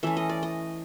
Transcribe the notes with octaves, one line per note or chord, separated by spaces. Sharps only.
E3 A3 C#4 E5
D#5
D5
D#5